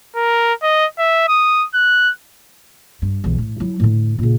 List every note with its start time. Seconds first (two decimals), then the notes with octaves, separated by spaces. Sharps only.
0.16 A#4
0.63 D#5
0.98 E5
1.28 D#6
1.74 F#6
3.02 G2
3.24 B1 E2
3.38 A2
3.60 F#3 E4
3.80 A2 D3
4.19 A#2 C#3